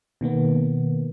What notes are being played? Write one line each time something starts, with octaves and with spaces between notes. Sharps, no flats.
B2 D#3 A#3 B3